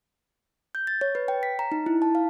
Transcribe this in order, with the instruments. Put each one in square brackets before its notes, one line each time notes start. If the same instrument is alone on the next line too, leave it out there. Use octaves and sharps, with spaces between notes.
[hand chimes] G6
A6
C#5
B4
G5
B6
A#5
D#4
E4
A5
F5